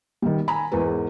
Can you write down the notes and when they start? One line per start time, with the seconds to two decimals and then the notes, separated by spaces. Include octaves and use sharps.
0.22 D#3 G3
0.48 G#5 A#5 B5
0.72 E2 G#2 A#4 B4